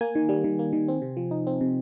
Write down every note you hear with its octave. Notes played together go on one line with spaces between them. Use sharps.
A#3 G#5
D#3
G3
D#3
A#3
D#3
C4
C3
F3
D#4
C4
C3